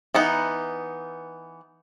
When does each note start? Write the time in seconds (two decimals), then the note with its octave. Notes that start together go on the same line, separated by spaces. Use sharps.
0.14 E3 B3 D#4